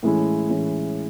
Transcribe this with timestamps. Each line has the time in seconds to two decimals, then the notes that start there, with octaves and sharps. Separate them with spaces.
0.03 A2 E3 G#3 C#4 E4
0.49 A2 E3 G#3 C#4 E4